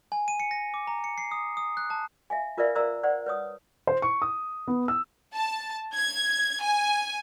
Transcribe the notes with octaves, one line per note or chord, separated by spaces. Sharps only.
G#5
D#7
C#7
A#6
D6
A#5
C#7
C7
D#6
D#6
F#6
A5
E5 F5 G#5
F4 A#4 B4 D5 E5 F5
A#4 C5 D5 F5 A#5 E6
C5 D5 F#5
B4 C#5 D#6
C5
C#6
D#6
B3
E6
A5
G#6
G#5